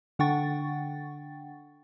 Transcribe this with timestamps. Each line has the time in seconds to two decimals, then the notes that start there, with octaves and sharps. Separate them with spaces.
0.19 D3 D4 F#5 G5 C#6 A6